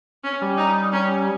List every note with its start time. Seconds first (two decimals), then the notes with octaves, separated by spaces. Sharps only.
0.24 C#4
0.41 G3
0.58 D#4
0.93 C#4